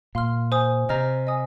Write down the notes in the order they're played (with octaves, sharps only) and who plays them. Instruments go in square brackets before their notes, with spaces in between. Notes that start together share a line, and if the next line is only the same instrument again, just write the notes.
[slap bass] A#2 [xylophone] F5 C6 F6
[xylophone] C5 G#5 D#6
[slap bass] C3 [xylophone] C5 D#5 A#5 F6
[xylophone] D#5 G#5 D#6